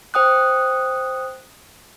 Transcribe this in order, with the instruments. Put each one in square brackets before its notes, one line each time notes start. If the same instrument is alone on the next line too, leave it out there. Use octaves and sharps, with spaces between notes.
[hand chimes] C5 G5 D#6 F#6